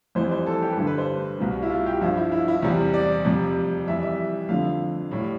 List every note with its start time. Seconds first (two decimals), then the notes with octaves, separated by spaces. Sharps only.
0.15 F2 E3 G3 C5
0.31 C5
0.46 A4
0.62 G4
0.72 B4
0.77 G2 D3 G3 A4
0.87 B4
0.98 C5
1.39 C2 B2 G3
1.62 E4
1.70 F4
1.86 G4
2.01 G2 F3 E4
2.17 E4
2.32 E4
2.48 E4
2.63 E2 C3 G3
2.94 D5
3.25 F2 C3 G3
3.87 F2 E3 G3 E5
4.03 E5
4.49 F2 D3 F3 F5
5.11 A2 G3